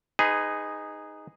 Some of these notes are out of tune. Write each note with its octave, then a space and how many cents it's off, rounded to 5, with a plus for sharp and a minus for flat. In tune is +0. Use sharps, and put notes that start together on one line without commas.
D#4 +0 G#4 -10 B4 +30